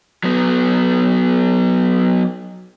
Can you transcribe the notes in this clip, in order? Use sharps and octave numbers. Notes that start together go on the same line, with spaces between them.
F#3 B3